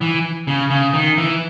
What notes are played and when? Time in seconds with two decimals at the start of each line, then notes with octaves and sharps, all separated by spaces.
0.01 E3
0.47 C#3
0.70 C#3
0.93 D#3
1.18 E3